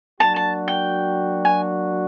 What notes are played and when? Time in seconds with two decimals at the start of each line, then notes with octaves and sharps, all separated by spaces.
0.20 F#3 A#3 D4 F#4 A5
0.36 A5
0.68 G5
1.45 G#5